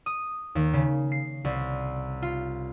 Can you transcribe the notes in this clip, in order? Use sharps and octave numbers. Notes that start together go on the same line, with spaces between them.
D#6
D#2
C#3
C7
C2
F4